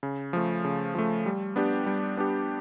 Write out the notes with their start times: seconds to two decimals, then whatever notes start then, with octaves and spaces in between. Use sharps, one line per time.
0.03 C#3
0.33 F3 A3
0.64 C#3
0.95 F3 A3
1.26 G3
1.56 B3 D4 G4
1.86 G3
2.17 B3 D4 G4